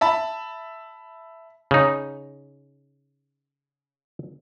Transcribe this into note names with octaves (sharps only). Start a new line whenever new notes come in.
E5 A5 B5
C#3 D#4